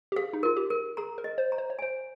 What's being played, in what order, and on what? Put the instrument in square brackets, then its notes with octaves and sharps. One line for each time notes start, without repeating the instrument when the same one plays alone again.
[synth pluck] G4
[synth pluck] G#4 [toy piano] F5
[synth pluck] D#4
[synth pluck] F4 [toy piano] A#4
[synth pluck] G4
[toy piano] A#4
[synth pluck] G#4 [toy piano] A#5
[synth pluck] A#4
[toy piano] D#5
[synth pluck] C5
[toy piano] A#5
[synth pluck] C5
C#5
[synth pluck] C5 [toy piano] G#5